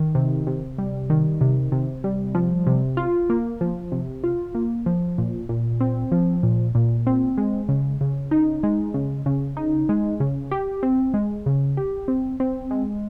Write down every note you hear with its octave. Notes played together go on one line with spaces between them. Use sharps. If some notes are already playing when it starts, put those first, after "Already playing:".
Already playing: D#3
C3
C3
G3
D#3
C3
C3
G3
F3
C3
F4
A#3
F3
C3
F4
A#3
F3
A#2
A#2
C4
F3
A#2
A#2
C4
G#3
C#3
C#3
D#4
G#3
C#3
C#3
D#4
G#3
C#3
G4
C4
G#3
C#3
G4
C4
C4
G#3